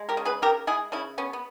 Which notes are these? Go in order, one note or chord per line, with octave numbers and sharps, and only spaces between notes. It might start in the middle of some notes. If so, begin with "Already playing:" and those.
Already playing: G#3
G4 A#4
C#3
G#4 B4
C#3 G4 A#4
G#3 E4 G#4
C#3 C#4 E4
B3 C#4
B3